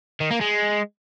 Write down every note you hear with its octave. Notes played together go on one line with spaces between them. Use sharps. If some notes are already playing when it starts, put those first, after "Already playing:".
D#3
A#3
G#3